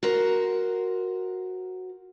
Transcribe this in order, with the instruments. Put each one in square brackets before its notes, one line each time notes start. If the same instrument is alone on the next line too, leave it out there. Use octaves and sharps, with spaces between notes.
[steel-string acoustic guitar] F#4 A#4 C5